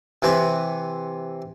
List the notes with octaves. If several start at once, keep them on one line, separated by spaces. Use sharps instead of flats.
C3 E3 C4 B4